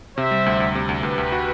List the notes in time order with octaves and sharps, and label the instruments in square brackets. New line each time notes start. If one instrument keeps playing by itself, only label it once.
[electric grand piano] C3 [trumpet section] C5 E5
[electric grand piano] G3
D2
D2
C3
D2
[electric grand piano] D2 [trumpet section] G4 B4
[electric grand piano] D2
F#4